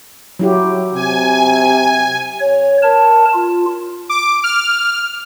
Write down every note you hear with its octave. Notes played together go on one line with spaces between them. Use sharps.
F#3 E4 G4
C3 G#5
C#5
A#4 A5
F4
D6
F6